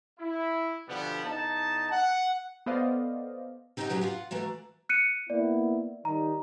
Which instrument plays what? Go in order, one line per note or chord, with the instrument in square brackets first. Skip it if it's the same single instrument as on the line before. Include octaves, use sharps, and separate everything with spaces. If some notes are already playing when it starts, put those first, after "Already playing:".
[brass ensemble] E4
B2 D3 F3 G3 B3
E2 D#4 D#5 A5
F#5
[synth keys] B3 A4 C5 D5 D#5 F5
[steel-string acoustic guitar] C4 D#4 G4 D5 D#5 F#5
B2 F#3 C#4 F#4 G4
F4 F5 F#5
E3 A3 A#3 F#4
[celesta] F#6 C#7 D#7
[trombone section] A#3 B3 E4 [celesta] D5
[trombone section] D#3 G3 D#4 [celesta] A#5